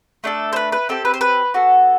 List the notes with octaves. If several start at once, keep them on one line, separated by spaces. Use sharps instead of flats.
A3 D4 A4
C5
B4
B4
C4 G4 A4
B4
C5
B4
B3 F#4 A4